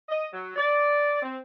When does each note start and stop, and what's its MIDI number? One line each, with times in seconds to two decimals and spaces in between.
0.09 0.27 75
0.33 0.56 54
0.56 1.21 74
1.22 1.37 60